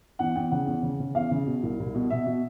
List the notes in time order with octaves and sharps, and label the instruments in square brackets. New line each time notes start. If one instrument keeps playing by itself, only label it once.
[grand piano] E2 F#5
E2 G5
C#3 F#5
E2
C#3
C#3
E2 F5
C#3
B2
C2
C2
B2
B2 E5
B2